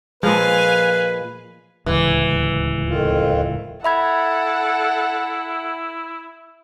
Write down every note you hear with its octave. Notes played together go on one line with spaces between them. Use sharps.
A#2 F3 G#3 B4 F5 G#5
D1 C#2 E3
F2 D#3 F4
E4 A4 E5 F#5 B5 G#6